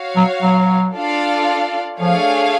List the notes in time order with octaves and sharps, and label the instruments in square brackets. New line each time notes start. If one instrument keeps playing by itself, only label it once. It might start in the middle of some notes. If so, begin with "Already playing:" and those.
Already playing: [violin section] F#4 C#5 F5
[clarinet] F#3
F#3
[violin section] D4 F4 A4 D5 F5
[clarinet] F3 [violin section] A3 D4 G#4 C#5 F5